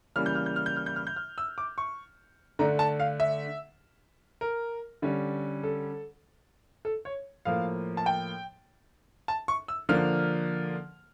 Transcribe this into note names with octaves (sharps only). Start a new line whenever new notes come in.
C#3 E3 G3 A#3 F6
G6
F6
G6
F6
G6
F6
G6
F6
G6
F6
E6
D6
C#6
D3 A3 D4 A#5
A5
F5
E5
A#4
D3 G3 C#4
A4
A4
C#5
A2 F3 A#3 F5
A5
G5
A5
C#6
E6
D3 F3 A#3 D4 F6